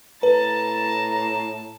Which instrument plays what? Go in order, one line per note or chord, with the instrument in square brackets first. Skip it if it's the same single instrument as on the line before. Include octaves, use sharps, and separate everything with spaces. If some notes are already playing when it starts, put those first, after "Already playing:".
[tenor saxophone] A2 [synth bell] B4 [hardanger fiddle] A5 [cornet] A#5